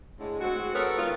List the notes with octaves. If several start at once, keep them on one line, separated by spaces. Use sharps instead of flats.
A2 D3 G#3
G#3 C4 F#4
G#3 B3 A4 A#4 C#5
D#3 F4